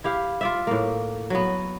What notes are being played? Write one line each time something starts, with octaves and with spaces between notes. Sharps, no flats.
E4 G4 F5
F4 D5 E5
A2 A#3
F#3 B3